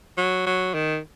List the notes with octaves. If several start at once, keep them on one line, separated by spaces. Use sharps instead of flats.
F#3
F#3
D#3